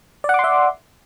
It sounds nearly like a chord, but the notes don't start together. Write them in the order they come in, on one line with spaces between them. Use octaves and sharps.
D5 F#5 D6 C6 E5